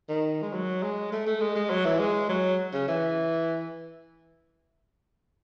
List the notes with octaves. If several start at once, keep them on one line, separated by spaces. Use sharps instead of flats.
D#3
G#3
F#3
G#3
A3
A3
G#3
G#3
F#3
E3
G#3
F#3
C#3
E3